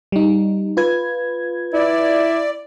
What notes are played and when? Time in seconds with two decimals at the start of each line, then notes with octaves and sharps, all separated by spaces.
0.12 G3 D#4
0.77 F4 B4 G#6
1.73 E4 D5